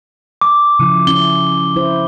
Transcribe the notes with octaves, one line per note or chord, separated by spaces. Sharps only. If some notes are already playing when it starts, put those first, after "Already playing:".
D6
C#3 F3 E4
C#4 E4 G7
E4 C5